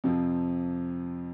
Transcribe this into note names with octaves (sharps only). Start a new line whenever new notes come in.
F2 C3 F3 C4